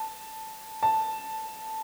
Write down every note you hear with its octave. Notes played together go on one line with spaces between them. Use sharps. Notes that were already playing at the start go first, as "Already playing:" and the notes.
Already playing: A5
A5